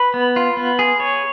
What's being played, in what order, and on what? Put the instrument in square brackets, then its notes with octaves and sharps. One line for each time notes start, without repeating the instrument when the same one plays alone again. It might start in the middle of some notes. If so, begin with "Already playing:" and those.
Already playing: [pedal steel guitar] B4
B3
F4
B3
G#4
C#5